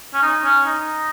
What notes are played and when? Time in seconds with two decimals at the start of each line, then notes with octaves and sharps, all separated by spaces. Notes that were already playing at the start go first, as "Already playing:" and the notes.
0.14 C#4
0.22 D#4
0.44 C#4
0.66 D#4